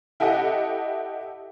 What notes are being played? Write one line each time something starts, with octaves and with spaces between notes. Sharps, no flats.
E4 G4 A4 D#5 F#5